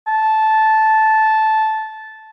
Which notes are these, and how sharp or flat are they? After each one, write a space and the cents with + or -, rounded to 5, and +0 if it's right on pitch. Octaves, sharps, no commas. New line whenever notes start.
A5 -10